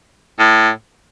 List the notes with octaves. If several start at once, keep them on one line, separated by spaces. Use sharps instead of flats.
A2